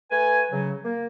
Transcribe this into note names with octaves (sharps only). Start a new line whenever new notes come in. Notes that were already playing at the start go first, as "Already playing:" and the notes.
A3 B4 G#5
C#3 F#3
A#3